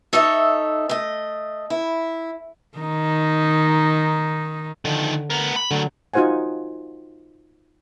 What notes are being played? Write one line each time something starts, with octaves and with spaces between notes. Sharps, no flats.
D#4 A4 C#5 D#5 E5
A3 D#5
E4
D#3 D#4
D3 D#3 F3
B3 A#4
B5
D3 F#3 A3
D#4 F4 F#4 C5 F#5 G#5